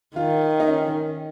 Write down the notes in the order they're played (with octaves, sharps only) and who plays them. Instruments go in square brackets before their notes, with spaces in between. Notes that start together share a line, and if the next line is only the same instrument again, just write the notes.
[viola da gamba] D#3 [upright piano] F4
[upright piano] D#4
C#4